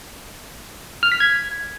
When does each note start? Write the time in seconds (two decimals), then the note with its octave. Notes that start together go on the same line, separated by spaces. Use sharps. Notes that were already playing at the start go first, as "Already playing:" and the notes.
1.03 F6
1.12 B6
1.20 G#6